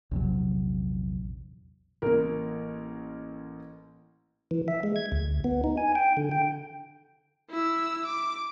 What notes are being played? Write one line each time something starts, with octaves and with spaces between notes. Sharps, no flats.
A#1 E2 C3 F#3
A1 A#3 A#4
E3
E5
G#3
G#6
D2
B3
D#4
G#5
G5
D3
G5
E4 E6
D6